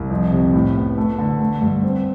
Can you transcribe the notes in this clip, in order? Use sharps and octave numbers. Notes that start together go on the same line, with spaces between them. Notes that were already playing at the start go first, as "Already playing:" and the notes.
Already playing: C2
F2
C3
A2
B3
A3
D3
A3
G2
C4